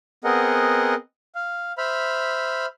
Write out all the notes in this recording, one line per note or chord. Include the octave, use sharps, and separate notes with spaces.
B3 C4 G#4 A#4 D#5 F#5
F5
C5 E5 B5 F6